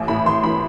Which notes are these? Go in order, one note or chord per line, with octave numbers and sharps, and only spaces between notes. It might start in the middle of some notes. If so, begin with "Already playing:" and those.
Already playing: A1
A2 B5
A1 C6
E3 B5